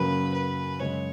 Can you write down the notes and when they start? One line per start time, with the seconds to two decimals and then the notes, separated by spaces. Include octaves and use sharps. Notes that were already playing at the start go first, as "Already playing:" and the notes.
Already playing: F#2 C#3 F#3 A#3 C#4 B4
0.34 B4
0.80 F#2 C#3 G#3 C#4 C#5